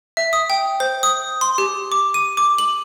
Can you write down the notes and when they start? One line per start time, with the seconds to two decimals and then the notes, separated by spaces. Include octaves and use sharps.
0.17 E5
0.33 D#6
0.50 G5
0.80 C5
1.03 D#6
1.41 C6
1.58 G4
1.92 D6
2.14 D#7
2.37 D6
2.58 F#7